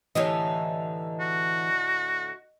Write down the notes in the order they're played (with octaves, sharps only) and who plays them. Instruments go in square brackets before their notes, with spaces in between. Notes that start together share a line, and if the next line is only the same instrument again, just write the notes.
[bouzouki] A2 D3 D#4 [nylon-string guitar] E3 G4 C#5 [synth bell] D#5
[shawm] F#4